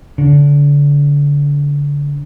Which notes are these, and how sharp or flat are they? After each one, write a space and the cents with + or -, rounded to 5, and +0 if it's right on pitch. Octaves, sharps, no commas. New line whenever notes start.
D3 -30